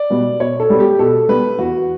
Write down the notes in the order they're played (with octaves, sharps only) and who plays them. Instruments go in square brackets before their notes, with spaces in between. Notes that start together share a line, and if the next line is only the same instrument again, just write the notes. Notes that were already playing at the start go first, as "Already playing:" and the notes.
Already playing: [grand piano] D5
B2 G3 B3
B2 C#5
A4
G3 B3
G4
B2 A4
G3 B3 B4
E2 F#4